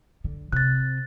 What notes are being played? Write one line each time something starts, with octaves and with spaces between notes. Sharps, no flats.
D3
C3 F#6 A6